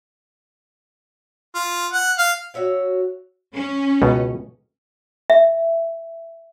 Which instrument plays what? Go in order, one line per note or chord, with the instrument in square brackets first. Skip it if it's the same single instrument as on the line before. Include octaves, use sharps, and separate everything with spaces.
[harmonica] F4
F#5
F5
[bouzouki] F#4 C#5 E5 F5
[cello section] C#4
[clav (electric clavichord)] C#2 B2
[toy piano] E5